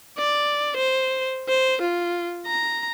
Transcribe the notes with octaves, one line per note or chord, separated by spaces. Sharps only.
D5
C5
C5
F4
A#5